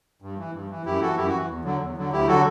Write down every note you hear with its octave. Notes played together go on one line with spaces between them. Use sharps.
G2
E3
G2
E3
F#2 E4 G4
E3 F#4 A4
F#2 E4 G4
F#4
E3
E2
D3 F#3
E2
D3 F#3
D2 E4 G4
D3 F#3 F#4 A4